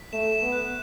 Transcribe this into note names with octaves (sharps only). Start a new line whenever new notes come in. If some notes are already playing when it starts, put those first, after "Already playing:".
Already playing: B6
A3 E7
E7
B3
F#6